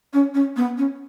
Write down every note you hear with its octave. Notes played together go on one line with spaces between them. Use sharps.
C#4
C#4
B3
C#4